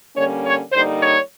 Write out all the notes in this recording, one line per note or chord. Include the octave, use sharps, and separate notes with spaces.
D3 G3 A#3 C#4 C#5
C#5
D3 G3 A#3 D#4 C5
C#5